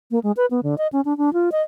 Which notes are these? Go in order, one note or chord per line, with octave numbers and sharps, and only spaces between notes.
A#3
G#3
B4
B3
D3
D#5
C#4
D4
D4
F4
D#5